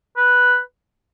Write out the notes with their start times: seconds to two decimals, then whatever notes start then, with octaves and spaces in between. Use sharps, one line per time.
0.17 B4